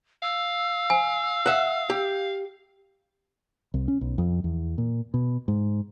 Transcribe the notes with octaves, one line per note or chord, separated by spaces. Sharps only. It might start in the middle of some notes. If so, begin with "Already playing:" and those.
F5 E6
G#5
E5 F#5
G4
C2
C#4
B1
F2
E2
A#2
B2
G#2